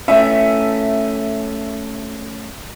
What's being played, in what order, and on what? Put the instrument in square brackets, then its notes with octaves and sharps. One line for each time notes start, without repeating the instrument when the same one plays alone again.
[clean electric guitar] A3 C#4 [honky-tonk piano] E5